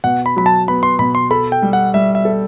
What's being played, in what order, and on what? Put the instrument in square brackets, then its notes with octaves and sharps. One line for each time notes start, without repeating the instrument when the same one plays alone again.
[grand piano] B2 [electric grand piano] F#5
[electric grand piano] B5
[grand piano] F#3 [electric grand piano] B5
[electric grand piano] A5
[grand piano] B3 [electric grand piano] B5
[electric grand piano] C6
[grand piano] B2 [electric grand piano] B5
[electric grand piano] C6
[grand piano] A4 [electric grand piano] B5
[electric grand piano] G5
[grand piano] G3
[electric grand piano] F#5
[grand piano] G3 [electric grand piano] E5
[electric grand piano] E5
[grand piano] A4